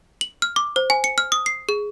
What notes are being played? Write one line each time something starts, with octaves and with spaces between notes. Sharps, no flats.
F#7
F6
D6
C5
G#5
C#7
F6
D#6
C7
G#4